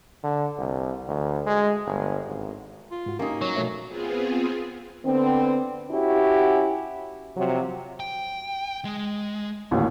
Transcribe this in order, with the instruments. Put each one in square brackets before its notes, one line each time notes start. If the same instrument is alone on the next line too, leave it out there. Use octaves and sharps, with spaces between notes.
[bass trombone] D3
C2
D2
G#3
G1
G#1
[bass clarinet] F4
[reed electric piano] G#2 F#4
[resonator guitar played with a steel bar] A#3 D#4 [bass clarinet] C#4 [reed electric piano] G4
[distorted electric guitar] F#3 [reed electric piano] C#5
[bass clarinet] B2 [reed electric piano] A3 C#5 E5
[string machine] B3 C4 F4 G#4
[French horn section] D3 B3 C4
C#4 E4 F#4 G4
C3 F3 F#3
[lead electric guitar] G5
G#3
[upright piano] A1 D#2 A#2